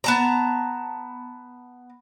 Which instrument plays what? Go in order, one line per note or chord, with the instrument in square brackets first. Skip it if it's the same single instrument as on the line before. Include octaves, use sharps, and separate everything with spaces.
[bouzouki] B3 A5 A#5